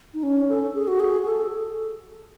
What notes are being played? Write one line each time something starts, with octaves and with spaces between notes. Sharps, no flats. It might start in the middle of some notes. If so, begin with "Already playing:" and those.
D#4
C#4
A4
G#4
F#4
G#4
A4